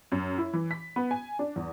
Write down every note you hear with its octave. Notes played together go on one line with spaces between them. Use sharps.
F#2
E4
E3
B6
B3
G#5
D4
E2